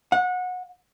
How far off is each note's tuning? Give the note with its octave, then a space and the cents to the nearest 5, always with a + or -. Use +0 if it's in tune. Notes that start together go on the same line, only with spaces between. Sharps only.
F#5 -25